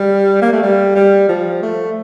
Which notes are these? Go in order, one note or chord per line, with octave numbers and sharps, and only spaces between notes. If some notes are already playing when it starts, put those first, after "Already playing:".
Already playing: G3
A#3
A3
G3
G3
F3
A3